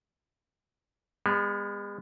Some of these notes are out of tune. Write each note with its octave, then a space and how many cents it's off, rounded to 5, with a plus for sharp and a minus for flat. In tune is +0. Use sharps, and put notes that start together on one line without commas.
G#3 -40 B3 +0